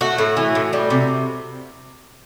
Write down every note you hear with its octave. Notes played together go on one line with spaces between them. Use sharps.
A3 F#4
A2
E3
A2
G3
C3